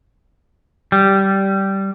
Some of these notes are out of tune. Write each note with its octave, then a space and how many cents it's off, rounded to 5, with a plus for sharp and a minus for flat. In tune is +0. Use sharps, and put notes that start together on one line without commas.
G3 -10